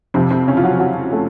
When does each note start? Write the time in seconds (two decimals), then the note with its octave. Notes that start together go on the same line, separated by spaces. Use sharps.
0.14 F2 C3 F3 C4
0.30 C3 C4
0.47 C#3 C#4
0.57 F4
0.64 F#3 F#4
0.80 F#3 F#4
1.12 A3 A4